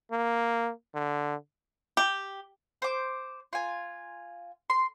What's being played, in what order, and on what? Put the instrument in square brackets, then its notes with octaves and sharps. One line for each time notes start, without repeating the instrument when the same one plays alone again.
[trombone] A#3
D3
[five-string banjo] G4
[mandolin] C5 D6
F4 G#5
C6